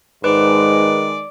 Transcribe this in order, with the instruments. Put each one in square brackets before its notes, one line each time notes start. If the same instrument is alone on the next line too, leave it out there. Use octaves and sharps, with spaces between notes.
[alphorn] G#2 [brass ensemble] D#3 G#3 [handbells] B4 [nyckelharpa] D5